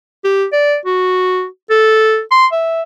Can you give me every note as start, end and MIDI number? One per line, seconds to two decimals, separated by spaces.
0.24 0.46 67
0.52 0.76 74
0.85 1.46 66
1.70 2.20 69
2.31 2.47 84
2.52 2.82 76